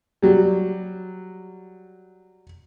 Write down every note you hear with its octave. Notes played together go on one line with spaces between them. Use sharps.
F#3 G3